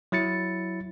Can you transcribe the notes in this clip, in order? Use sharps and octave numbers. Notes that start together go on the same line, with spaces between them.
F#3 E4 A6 C#7